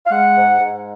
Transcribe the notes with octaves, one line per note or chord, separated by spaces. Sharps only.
F5
G#3 F#5
G#2
G#2